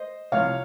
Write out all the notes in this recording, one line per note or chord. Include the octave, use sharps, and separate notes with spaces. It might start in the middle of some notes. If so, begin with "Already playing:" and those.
Already playing: C5 D#5
C2 C3 F3 C#5 F5